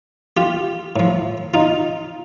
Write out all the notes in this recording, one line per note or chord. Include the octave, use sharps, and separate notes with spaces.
F4 G4
A2 F3
D#4 F4